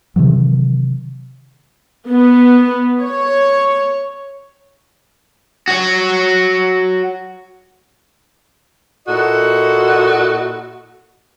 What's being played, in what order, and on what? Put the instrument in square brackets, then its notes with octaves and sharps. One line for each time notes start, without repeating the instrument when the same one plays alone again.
[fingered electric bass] C3 D#3 E3 F#3
[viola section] B3
C#5
[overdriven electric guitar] F#4 C#5
[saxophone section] A#2 E4 F#4 A4 D#5